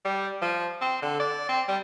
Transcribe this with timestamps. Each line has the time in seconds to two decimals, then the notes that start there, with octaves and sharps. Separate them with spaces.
0.05 G3
0.42 F3
0.81 C4
1.02 D3
1.19 D5
1.49 C4
1.68 G3